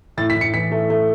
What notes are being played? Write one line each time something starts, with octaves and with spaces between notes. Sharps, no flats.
A2 A6
B6
A2
C#7
E3 B6
A3
A3